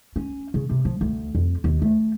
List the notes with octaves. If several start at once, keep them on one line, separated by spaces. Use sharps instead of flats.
C#4
C#3
C3
F3
D2
F2
D#2
A3